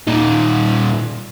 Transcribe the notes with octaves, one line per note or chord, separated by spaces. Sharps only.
A#2 D#4